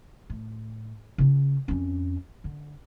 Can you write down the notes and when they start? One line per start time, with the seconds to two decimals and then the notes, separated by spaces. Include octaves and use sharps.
0.30 A2
1.18 C#3 F4
1.68 F2 C#4
2.44 D3